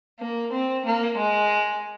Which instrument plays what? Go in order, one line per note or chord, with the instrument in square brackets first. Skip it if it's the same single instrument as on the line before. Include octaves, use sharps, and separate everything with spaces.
[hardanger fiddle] A#3
C4
A#3
G#3